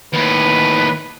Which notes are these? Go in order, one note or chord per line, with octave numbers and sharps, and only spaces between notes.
D#2 A2 B4